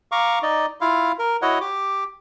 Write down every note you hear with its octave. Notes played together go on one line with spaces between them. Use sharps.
F5 A#5 C#6 D6
D#4 D5 D#5
E4 F4 F5
A#4
E4 F#4 C#5 D#5 F#5
G4 D6